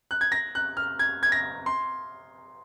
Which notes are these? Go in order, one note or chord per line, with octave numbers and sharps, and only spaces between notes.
F#6
G#6
A#6
F#6
F6
G#6
G#6
A#6
C6